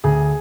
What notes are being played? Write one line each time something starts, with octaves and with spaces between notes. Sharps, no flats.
D2 G#4 G#5